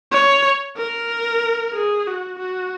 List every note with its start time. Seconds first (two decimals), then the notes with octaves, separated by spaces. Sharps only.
0.12 C#5
0.77 A#4
1.73 G#4
2.07 F#4
2.39 F#4